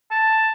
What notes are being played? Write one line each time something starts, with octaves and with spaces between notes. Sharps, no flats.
A5